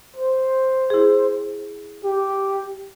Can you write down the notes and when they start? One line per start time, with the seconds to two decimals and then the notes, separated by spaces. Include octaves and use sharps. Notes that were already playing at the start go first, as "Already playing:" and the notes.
0.16 C5
0.90 E4 G#4
2.04 G4